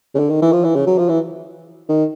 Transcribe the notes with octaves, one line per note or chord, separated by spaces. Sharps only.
C#3
D3
D#3
E3
F3
E3
C#3
F#3
F3
E3
D#3